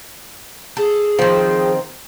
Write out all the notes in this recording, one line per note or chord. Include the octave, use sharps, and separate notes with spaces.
G#4 A4
D#3 F3 C4